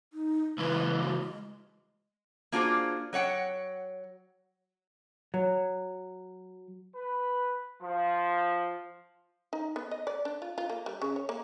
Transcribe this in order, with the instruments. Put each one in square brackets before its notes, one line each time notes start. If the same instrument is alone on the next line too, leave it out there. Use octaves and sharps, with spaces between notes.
[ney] D#4
[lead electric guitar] C#2 E3 [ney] B4
[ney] F#4
G#3
[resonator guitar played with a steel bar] A#3 D4 F4 F#4 G#4 C5
F#3 C#5 F#5 G5
[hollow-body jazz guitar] F#3
[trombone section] B4
F3
[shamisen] D#4
B3
D#5
D5
D4
F4
F4
A#3
G3
C#3
C#5
A#3